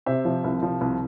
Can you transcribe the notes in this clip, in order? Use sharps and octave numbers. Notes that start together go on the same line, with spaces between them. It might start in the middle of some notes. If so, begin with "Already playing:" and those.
C3 C5 E5
F3
C2
F3
C2